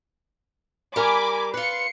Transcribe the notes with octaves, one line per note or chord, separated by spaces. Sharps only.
G3 A#4 G#5 B5 D6
F4 B4 C7 C#7